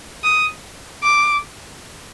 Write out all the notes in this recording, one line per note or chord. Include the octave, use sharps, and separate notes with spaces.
D#6
D6